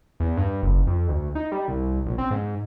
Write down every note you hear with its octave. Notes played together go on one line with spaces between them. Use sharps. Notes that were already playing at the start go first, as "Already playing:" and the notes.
E2
G2
F#1
F2
D2
D#4
G3
C2
A#1
C4
G#2